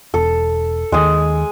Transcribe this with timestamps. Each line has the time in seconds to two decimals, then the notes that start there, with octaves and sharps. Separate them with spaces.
0.14 E1 A4
0.92 D#2 D#3 G#3 G#4